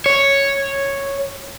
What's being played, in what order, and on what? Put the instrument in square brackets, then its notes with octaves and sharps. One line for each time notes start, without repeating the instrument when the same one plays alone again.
[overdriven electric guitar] C#5